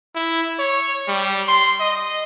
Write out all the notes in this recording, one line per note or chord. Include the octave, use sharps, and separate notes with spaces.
E4
C#5
G3
C6
D#5